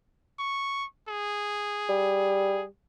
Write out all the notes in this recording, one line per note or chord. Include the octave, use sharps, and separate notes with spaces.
C#6
G#4
G3